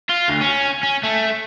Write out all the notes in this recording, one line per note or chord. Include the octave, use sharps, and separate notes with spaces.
F4
D2
C#4
C#4
A3